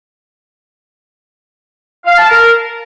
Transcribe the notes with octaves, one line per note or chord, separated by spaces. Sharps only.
F5
A5
A#4